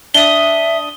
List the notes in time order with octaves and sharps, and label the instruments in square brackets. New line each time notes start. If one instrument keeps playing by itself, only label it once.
[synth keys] D4 D#6 [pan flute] E5 [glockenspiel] G7